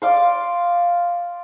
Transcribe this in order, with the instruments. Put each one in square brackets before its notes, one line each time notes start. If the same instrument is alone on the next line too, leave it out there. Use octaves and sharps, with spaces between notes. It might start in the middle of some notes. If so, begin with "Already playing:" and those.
[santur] D5 F5 C6